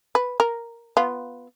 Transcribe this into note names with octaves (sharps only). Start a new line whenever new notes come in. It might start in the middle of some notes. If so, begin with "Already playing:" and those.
B4
A#4
B3 F4